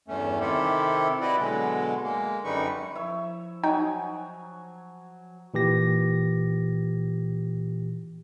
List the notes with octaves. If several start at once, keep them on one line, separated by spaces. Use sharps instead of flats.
E2 G2 A3 C#4
C3 D#3 C4 E4 G4 A4
E4 F#4 G4 B4 D5 D#5
B2 D3 F#3 G#3
G#3 A#3
F#2 D3 G3 D#4 B4 C#6
F3 E4 C#5 E6
F#3 D#4 G5 G#5 D#6
A#2 E3 G4 A#6